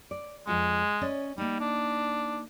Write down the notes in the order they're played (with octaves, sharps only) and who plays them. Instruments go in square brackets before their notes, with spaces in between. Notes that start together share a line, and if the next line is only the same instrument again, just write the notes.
[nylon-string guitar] D5
[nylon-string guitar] F2 F4 F#5 [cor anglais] G#3
[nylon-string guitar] C#4 D5 D#5
[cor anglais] G3 [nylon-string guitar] A#3 D#4
[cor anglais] D4